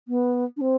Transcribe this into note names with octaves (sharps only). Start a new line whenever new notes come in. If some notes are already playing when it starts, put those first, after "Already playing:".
B3
D4
C4